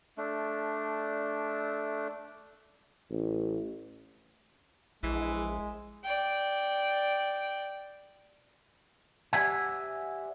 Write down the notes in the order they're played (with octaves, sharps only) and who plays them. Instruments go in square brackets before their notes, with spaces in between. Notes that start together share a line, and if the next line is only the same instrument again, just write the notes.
[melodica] A3 D4
[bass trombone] A1
[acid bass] A#1 [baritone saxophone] E3 [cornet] G#3
[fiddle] D5 G5
[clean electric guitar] G4 C5 D5 E5 F#5 G#5